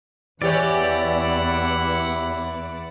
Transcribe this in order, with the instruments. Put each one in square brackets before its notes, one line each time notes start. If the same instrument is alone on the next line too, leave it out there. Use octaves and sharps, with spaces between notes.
[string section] E2 [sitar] E3 G4 C#5 [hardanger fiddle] E4 F#5 [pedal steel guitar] D5